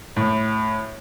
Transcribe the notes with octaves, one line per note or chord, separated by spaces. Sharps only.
A2